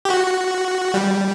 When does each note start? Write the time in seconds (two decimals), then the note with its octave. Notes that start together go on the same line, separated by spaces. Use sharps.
0.05 G4
0.10 F#4
0.94 G3